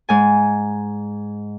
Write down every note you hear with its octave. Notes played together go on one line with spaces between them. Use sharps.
G#2 G#5